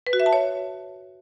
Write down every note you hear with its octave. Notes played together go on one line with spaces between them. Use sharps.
B4
F#4
E5
A5
C#5